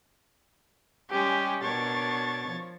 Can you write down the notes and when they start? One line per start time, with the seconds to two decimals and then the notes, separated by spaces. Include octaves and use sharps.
1.10 G3 G#3 C#4 G4
1.62 B2 D4 A#4 C#5 A6
2.47 F3